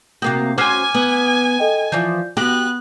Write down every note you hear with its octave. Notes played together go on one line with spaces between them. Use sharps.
C3 A#3 F#4 G5 D#6 G6
C#4 F#4 C5 G#5 D6 F6 G#6
B3
A4 D#5 G5
E3 F3 F4 D5 G6
B3 F#4 G4 F#6 F#7